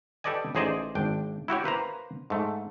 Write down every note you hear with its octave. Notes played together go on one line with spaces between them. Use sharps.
G4 A4 B4 D5 D#5 G#5
A1 D#4 G#4 C5 D5 D#5
G#1 D4 G5
E4 F#4 G4 C#5
A#3 B4 C5 A#5
G#2 A3